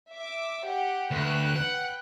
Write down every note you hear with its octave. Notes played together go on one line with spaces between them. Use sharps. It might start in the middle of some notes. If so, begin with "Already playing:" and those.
E5 D6
G4 F#5
D2 B4 G5 F#6
F#5